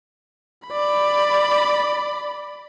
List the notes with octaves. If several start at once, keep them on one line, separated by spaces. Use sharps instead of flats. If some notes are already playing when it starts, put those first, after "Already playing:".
D5 B5